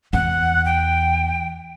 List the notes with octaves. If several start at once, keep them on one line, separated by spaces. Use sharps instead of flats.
E2 F#5
G5